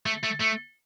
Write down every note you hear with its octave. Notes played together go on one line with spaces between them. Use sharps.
A3
A3
A3